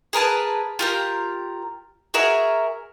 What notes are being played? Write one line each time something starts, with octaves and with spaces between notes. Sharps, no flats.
G#4 A#4 B4 A5
F4 G4 A#4
F#4 G#4 A#4 E5